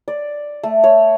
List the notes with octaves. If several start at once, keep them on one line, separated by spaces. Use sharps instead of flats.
D5
A3
C#5